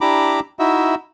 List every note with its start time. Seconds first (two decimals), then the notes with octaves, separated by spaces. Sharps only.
0.01 D4 E4 G4 A#5 B5 D6
0.59 D#4 E4 F#4 E5